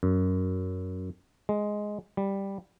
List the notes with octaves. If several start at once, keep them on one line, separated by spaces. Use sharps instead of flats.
F#2
G#3
G3